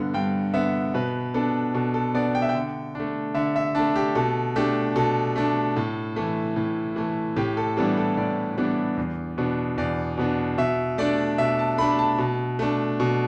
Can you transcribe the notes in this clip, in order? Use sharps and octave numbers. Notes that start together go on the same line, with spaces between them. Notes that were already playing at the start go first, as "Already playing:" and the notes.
Already playing: G2 D3 B3
G2 G5
D3 B3 E5
B2 B4
B3 D4 A4
B2 A4
A4
B3 D4 D5
G5
E5
G5
D3
A3 D4
D3 E5
E5
A3 D4 A5
G4
B2 A4
A3 D4 G4
B2 A4
A3 D4
A2
E3 A3
A2
E3 A3
A2 G4
A4
E3 G3 B3 D4 A4
A4
A2 D5
E3 G3 B3 D4
E2
B2 B3 D4
E2 D5
B2 B3 D4
B2 E5
A3 D4 D5
B2 E5
A5
A3 D4 B5
A5
B2
A3 D4
B2